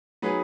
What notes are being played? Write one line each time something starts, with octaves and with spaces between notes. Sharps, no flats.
F#3 B3 D#4 G#4 B4